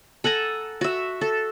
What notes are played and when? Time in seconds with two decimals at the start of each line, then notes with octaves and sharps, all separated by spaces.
0.24 A4 F#5 G#5 A#5
0.81 F#4 E5
1.21 A4